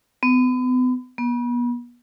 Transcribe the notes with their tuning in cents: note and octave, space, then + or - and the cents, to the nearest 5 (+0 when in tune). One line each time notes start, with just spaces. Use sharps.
B3 +35
B3 -35